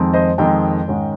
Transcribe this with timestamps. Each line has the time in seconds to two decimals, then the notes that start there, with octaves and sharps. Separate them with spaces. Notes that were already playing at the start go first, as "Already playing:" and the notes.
Already playing: F2 D#3 G#3 C4
0.14 C5 D#5
0.38 F2 D#3 G#3 C4 D#5 G5
0.88 G#2 D#3 G#3 C#4